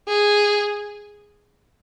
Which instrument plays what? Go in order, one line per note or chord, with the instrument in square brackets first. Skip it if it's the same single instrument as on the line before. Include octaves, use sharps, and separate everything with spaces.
[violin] G#4